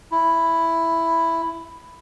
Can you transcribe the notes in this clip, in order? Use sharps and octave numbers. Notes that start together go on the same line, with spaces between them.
E4